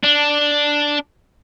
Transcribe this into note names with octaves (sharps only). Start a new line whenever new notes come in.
D4